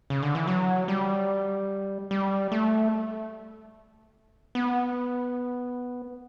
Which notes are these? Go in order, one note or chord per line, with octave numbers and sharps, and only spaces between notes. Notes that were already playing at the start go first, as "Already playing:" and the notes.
C#3
D3
E3
F#3
G3
G3
A3
B3